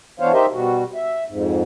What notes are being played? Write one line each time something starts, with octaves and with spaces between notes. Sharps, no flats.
E3 B3 D4 C5 C#5 F5
D#4 G4 A#4 C5 D#5 E5
B2 G3 F#4
E5
F2 G#2